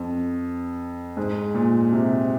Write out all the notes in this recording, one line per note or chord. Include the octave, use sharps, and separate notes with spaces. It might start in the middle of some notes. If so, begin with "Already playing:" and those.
Already playing: F2
G#2
A#2
C3